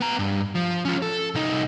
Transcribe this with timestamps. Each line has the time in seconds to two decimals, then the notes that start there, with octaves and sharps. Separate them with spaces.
0.01 B3 A#5
0.19 G2
0.55 F3
0.85 C#4 F4
1.02 A4
1.35 C2 D#4